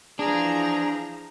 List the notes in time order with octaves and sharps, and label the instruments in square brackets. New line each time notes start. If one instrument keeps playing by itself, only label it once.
[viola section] E3 F3 A#5 [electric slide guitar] D4 [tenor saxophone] G#4